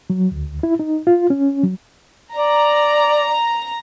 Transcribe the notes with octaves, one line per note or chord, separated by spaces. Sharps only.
F#3
D2
E4
D#4
F4
C#4
F#3
D5 A#5